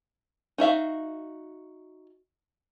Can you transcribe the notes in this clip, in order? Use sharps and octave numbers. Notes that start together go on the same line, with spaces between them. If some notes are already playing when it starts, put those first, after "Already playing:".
D#4 F#4 E5 F5